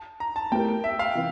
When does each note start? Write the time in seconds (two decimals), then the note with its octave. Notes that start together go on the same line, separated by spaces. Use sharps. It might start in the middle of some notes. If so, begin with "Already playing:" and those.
Already playing: A5
0.20 A#5
0.36 A5
0.52 A3 E4 G4 A#4 G5
0.84 E5
0.99 F5
1.15 C3 E3